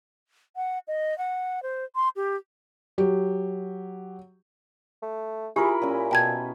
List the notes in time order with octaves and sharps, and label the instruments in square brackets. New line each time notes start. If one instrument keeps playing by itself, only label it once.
[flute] F#5
D#5
F#5
C5
C6
G4
[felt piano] F#3 G4
[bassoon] A3
[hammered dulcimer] E4 A#4 B5 [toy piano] F4 G4 [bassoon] G#4
[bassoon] A#2 [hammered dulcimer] C#4 G#4
[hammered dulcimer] B2 [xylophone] G5 A5 G#6